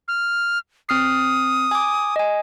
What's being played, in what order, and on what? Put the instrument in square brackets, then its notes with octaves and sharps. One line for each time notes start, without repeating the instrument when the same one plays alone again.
[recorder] F6
[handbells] C4 F6 C7 [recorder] D#6
[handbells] G#5 D6
D#5 G#5